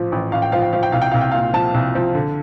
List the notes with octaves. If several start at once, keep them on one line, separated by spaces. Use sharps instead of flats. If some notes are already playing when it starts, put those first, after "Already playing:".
Already playing: A1 F3
A1
A1 F5
G5
F3 F5
G5
F3 F5
G5
C2 F5
G5
C2 F5
G5
A#2 F5
F3 A5
C2
F3
D3